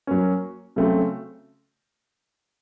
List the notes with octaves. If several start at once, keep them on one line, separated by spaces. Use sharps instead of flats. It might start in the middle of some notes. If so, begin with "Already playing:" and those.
F#3 A#3 C#4
C#3 F#3 A3 C4